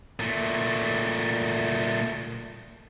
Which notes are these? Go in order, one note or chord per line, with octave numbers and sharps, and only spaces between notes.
A#2 A3